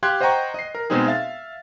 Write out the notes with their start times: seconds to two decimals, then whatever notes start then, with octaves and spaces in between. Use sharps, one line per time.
0.03 G4 F5 C6 F#6 G#6
0.21 C5 D#5 F#5 G5 A#5 C#6
0.54 D#5 C7
0.75 A#4
0.90 B2 G#3 C4 D#4 G#4
1.07 E5 F5 A6